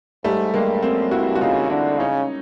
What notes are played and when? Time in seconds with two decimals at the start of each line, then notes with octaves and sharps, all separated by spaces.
0.24 G#2 G3 A3
0.54 G2 G#3 A#3
0.83 F#2 A#3 C4
1.11 G2 E4 F#4
1.35 F#4
1.41 C#3 D#4 F4
1.70 D3 D4 E4
1.99 C#3 C#4 D#4